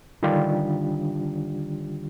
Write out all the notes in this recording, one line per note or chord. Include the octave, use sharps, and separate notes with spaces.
D3 D#3 G3 D4 F4 G4